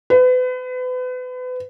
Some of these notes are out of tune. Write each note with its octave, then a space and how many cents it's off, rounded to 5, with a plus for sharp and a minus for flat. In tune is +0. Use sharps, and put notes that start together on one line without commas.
B4 +35